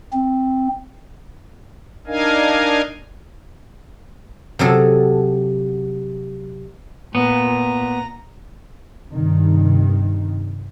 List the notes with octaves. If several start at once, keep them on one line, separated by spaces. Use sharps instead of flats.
C4
D4 D#4 A#4 D#5 F5 G#5
C3 F#3 G#4 A4
A#2 B3 A#5
G2 C3 D#3